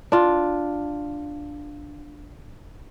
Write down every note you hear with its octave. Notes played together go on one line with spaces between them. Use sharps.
D4 F4